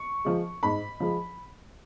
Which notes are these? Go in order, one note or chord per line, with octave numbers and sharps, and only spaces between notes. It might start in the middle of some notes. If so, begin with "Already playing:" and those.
Already playing: C#6
F3 G#3
G#2 B5
F3 G#3